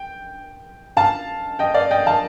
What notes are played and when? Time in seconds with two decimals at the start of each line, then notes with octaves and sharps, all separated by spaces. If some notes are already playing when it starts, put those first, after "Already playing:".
Already playing: G5
0.97 F5 A5
1.59 D#5 G5
1.74 D5 F5
1.91 D#5 G5
2.06 F5 A5